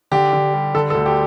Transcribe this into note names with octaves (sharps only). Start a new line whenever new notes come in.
D3 G4
D3
G3
D3 A4
A4
D2
G4